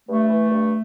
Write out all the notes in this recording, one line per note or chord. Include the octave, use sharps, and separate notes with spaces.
G2 A3
E3
G2